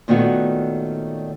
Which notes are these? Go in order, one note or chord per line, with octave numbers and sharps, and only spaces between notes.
A#2 D#3 A3 B3 C#4 F#4